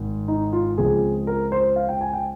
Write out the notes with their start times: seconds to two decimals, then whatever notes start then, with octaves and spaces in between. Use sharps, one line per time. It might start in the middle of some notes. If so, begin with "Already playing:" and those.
Already playing: G#1 G#2
0.28 D#4
0.53 F4
0.78 C#2 C#3 F3 C4 G#4
1.27 A#4
1.52 C5
1.76 F5
1.89 G5
2.01 G#5
2.13 G5